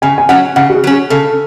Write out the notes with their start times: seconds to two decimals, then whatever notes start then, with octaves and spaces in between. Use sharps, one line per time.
0.02 C#3 G#5
0.18 G#5
0.29 F#3 C#4 F#5
0.56 C#3 F#5
0.70 F#4
0.74 G#4
0.84 F#3 C#4
1.10 C#3 A4